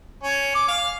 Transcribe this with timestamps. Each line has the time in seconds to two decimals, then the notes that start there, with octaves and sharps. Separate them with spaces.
0.23 C#4
0.55 D6
0.68 F5